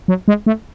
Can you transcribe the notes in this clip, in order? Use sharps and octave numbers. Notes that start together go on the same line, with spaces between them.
F#3
G#3
A3